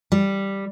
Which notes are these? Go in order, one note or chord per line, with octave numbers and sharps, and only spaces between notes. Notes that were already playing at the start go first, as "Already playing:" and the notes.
G3